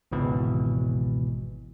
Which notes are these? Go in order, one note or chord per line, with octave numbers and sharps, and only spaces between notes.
G#1 C#2 B2 E3